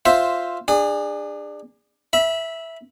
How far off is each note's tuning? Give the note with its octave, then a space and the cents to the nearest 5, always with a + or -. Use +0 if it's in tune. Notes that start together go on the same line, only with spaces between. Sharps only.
F4 +5 C5 +0 E5 +0
D4 +20 G#4 -25
E5 -5 B5 -25